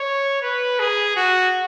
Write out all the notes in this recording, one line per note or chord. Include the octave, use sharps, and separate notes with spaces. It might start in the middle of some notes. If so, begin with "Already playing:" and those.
Already playing: C#5
B4
G#4
F#4